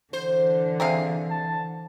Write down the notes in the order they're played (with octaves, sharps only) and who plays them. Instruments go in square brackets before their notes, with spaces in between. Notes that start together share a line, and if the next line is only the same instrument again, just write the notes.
[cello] D3 E3 [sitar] C5
[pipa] C3 G#4 F5
[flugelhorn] A5